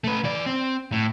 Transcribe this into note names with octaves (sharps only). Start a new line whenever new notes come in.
A3 B4
E3 D5
C4
A2